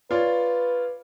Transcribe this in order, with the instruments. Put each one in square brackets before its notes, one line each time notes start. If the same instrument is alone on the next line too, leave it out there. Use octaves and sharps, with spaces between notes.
[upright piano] F4 C#5 D5 [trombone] B4